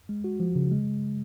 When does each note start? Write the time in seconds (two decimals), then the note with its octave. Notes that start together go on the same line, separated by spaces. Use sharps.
0.09 G#3
0.24 F#4
0.40 F3
0.56 C#3
0.71 G#3